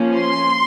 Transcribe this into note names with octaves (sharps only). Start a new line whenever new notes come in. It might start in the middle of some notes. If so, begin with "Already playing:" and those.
Already playing: F3 A#3 C#4
C6